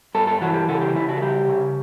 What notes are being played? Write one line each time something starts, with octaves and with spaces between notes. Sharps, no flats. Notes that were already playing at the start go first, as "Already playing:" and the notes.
G2 A4
A4
E3 F#4
G4
C#3 A4
G4
C#3 E4
F#4
A4
G3 G4
C#3